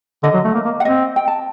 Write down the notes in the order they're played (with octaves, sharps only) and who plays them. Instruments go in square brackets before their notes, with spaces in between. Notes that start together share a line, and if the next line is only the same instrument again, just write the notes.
[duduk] D3 [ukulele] D#5
[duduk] F#3
A3
A#3
A#3
[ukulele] F#5
[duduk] C4 [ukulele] D#5
[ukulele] G5
A5